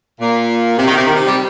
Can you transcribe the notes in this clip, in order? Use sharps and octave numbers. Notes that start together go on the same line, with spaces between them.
A#2
C3
D#3
C3
D#3
C3
G3